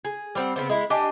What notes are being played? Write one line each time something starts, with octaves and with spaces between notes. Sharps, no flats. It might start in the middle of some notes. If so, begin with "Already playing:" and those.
G#4
G3 C4 F#5
C#3 G3 B3 C4
G#3 E4
D4 G4 D#5 G#5